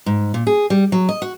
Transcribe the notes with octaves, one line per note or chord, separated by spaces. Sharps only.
G#2
A#2
G#4
G3
F#3
D#5
F#4